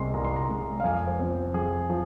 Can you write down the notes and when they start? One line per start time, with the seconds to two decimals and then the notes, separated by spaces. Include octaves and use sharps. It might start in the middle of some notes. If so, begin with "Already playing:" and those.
Already playing: C2 C3 G#3 D#5 C6
0.14 C2 A#5
0.25 C6
0.36 A#5
0.49 C3 G#3
0.80 F5
0.84 F2 G#5
1.07 C5
1.19 F3 C4
1.54 F2 G#4
1.90 F3